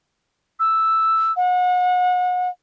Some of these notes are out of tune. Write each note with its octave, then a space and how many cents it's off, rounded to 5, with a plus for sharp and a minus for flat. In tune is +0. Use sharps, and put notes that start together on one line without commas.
E6 +0
F#5 -35